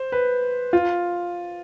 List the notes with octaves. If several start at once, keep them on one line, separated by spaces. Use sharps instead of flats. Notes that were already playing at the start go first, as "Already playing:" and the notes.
Already playing: C5
B4
F4